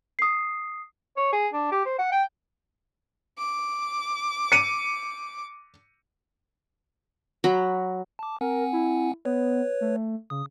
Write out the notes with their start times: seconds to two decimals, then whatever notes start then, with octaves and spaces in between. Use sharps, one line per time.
0.19 D#6 C7
1.17 C#5
1.32 G#4
1.53 D4
1.71 G4
1.85 C5
1.99 F#5
2.12 G5
3.39 D6
4.52 C#7 D#7
7.44 F#3 A#5 B5
8.19 A5 D6
8.41 C4 A#4 F#5 G#5
8.73 E4
9.25 B3 B4 C#5
9.81 A3
10.30 C#3 D#6